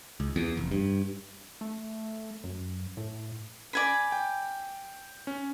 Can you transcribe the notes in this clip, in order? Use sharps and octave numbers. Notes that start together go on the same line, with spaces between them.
C#2
E2
F1
G2
A3
F#2
A2
D5 G#5 B5
G5
C#4